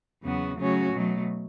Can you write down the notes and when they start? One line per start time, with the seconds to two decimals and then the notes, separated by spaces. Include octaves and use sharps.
0.23 E2 C#3 F#3 B3 F#4
0.57 C#3 F#3 A3 C#4 F#4
0.92 B2 F#3 A3